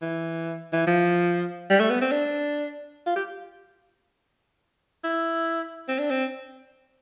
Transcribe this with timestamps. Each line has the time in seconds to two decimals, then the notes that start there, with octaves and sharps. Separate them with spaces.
0.02 E3
0.72 E3
0.87 F3
1.70 G3
1.80 A3
1.90 B3
2.01 C4
2.11 D4
3.06 F4
3.16 G4
5.04 E4
5.88 C4
5.99 D4
6.11 C4